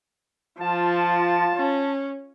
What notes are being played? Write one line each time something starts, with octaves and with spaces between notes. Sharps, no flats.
F3 F4 A5
C#4